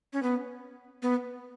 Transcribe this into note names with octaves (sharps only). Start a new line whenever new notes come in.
C#4
B3
B3